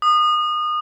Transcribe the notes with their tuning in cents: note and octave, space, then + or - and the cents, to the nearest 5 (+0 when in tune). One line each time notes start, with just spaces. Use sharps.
D#6 -30